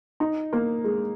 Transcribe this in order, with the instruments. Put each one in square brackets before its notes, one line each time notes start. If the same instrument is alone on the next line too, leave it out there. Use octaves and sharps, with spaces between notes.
[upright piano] D#4
A#3
G#3